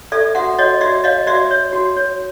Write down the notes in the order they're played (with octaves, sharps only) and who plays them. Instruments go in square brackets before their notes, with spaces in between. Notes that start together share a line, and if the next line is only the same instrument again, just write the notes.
[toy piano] A4 D5 E5
F#4 E5 F#5
F#4 C#5 D#5
F#4 D5 E5
C#5 D#5 F5
F#4 D5 E5
C#5
F#4
C#5